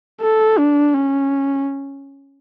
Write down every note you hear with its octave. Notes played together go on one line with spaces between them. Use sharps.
A4
D4
C#4